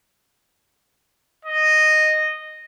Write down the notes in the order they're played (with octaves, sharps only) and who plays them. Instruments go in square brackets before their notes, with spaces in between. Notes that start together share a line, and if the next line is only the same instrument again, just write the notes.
[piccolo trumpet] D#5